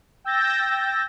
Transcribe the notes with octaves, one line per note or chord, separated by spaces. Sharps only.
G5 E6 G6 A6 A#6